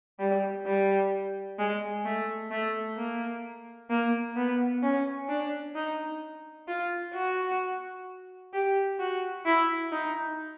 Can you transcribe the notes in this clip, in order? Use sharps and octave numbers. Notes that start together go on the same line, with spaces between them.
G3
G3
G#3
A3
A3
A#3
A#3
B3
C#4
D4
D#4
F4
F#4
G4
F#4
E4
D#4